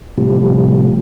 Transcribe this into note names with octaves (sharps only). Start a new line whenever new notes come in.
A2 C3 F3 G3